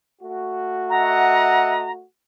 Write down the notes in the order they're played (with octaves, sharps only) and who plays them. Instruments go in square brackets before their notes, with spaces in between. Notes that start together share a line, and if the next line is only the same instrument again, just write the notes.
[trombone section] A3 F#4
[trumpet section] D#5 E5 F#5 [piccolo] A#5